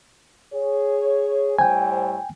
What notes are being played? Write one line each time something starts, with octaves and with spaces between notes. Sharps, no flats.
G#4 C#5
A2 G3 C5 G5 G#5